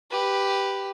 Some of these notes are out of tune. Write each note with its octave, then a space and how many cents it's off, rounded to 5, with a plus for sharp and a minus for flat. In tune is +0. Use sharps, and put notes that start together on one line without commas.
G4 +0 B4 +5